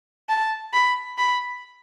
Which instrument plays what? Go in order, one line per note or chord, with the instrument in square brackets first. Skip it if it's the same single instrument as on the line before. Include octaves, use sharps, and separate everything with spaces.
[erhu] A5
B5
B5